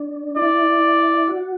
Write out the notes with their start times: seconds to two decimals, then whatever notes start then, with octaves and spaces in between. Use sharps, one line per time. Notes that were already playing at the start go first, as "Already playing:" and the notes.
Already playing: D4
0.36 E4 D5
1.28 F#4